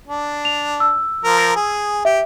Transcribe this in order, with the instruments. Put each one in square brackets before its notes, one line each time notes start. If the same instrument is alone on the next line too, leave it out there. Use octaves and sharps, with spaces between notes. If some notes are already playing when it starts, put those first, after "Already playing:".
[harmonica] D4
[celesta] F7
E6
[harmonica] F3 A#4
G#4
[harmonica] G4 [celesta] E5